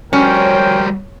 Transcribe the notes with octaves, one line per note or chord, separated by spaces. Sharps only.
G3 C#4 F#4 A#4 C5 C#5 G5